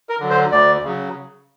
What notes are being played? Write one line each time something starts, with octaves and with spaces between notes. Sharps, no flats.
A#4
D3 F#3
C5
D2 D5
C#3 F#3